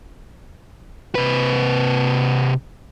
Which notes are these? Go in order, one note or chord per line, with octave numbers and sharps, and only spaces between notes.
C3 B4